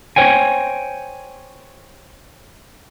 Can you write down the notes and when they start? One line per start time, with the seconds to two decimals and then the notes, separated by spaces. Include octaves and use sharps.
0.16 C5 C#5 G5 G#5